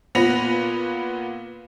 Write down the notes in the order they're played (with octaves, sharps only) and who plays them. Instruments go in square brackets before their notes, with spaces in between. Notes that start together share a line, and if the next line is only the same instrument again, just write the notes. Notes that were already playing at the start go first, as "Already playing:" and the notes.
[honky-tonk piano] A#2 B3 B4 A#6 F7